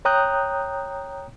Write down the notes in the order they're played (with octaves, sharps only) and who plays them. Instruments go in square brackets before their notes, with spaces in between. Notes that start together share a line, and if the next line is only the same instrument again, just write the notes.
[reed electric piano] C#5 G5 A#5 D#6 F#6 G6